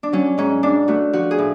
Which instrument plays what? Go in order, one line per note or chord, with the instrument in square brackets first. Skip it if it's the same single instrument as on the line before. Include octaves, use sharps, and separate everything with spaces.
[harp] D4
F#3 C#4
G#2 C#4
G#2 D4
A3 F#4
F3 F#4
G#4
A2